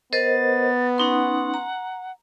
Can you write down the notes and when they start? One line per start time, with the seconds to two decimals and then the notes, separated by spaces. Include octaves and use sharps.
0.13 B3 A#4 C5 D#5 A6
0.98 C#4 D#4 F#5 C6
1.54 A#5